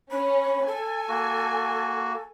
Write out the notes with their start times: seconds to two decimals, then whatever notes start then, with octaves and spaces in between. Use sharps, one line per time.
0.11 C#4 B5
0.67 A4 G#5
1.09 A#3 F#4